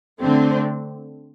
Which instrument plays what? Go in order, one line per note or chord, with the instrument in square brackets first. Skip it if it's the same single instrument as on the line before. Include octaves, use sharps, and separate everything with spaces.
[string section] D3 A3 C4